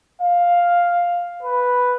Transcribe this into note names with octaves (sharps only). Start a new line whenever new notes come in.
F5
B4